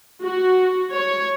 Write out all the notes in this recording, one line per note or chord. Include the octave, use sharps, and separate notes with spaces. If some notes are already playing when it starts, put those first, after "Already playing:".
F#4
C#5